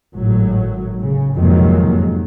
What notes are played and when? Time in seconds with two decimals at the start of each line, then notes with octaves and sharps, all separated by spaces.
0.14 G#1 A2 F#3
1.01 C#3
1.36 F2 G#2 C3 D#3 F#3 A#3